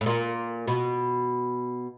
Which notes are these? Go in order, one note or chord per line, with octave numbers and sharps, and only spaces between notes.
A2
A#2
B2